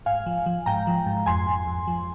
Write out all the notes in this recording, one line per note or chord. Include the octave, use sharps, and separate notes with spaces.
G#2 F5 G#5
F3
F3
G#2 G5 A#5
F3
G#2
F2 G#5 C6
F2
F2
F3